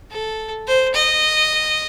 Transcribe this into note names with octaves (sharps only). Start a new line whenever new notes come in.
A4
C5
D#5